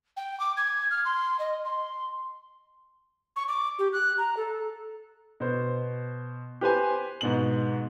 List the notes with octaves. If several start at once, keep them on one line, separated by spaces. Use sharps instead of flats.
G5
D6
G#6
F6
C6
D#5
C6
C#6
D6
G4
F#6
A#5
A4
B2 C5
G4 B4 C5 G#5
G#2 B2 F#7